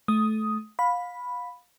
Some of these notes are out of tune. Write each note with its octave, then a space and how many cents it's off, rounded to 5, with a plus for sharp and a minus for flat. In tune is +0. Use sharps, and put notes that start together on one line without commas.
A3 -20 D#6 +5
F5 +25 B5 +0